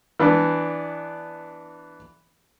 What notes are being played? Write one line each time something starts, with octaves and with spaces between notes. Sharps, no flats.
E3 B3 D4